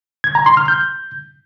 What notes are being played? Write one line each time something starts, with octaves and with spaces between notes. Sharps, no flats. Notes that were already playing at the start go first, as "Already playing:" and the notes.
G#6
A#5
C6
F6
G6